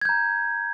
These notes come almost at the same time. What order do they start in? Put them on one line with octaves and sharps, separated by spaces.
G#6 G6 A#5